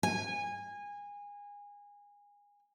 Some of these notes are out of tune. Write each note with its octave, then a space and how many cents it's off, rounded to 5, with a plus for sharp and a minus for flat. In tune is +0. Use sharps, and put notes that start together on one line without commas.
G#5 -25